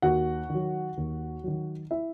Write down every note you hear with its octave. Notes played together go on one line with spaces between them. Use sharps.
D#2 F#4 F#5
D#3 F#3
D#2
D#3 F#3
E4 E5